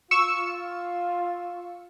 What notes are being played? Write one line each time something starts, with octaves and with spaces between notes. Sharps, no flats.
F4 C#6 E6